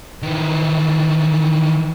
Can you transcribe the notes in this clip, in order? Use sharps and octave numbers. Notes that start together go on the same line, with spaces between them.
D#3 E3